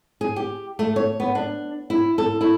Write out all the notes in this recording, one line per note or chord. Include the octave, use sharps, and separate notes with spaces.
G#4
G4
A3
C#5
B3
D4
E4
A4
E4